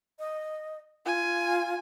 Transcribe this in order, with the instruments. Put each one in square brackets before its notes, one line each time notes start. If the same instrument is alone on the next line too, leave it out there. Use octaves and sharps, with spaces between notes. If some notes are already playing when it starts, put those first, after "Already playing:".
[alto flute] D#5
[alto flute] F4 [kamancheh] G#5